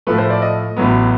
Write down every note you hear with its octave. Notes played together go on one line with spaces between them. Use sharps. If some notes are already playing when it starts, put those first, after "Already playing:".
A2 F3 A3 B4
C5
D5
D#5
A1 A2 F#3 B3